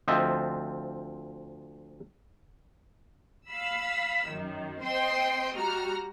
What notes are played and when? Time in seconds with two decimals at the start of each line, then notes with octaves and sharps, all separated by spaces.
0.08 D2 F3 C4 D#5 E5
3.49 F5 B5 E6
4.27 F#2 D#3
4.82 C4 C5 D#5 G5 C6
5.56 G3 F#4 A#5 F6